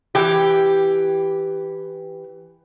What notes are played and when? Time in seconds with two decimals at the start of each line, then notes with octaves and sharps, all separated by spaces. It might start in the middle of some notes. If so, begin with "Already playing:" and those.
0.15 E3 G4